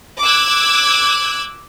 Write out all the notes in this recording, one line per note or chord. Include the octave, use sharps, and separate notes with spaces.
D6 E6 F#6 G#6